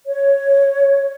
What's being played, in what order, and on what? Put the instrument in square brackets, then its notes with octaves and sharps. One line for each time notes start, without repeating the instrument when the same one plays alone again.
[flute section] C#5